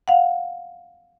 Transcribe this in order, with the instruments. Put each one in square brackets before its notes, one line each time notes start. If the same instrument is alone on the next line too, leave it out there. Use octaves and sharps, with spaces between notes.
[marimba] F5 F#5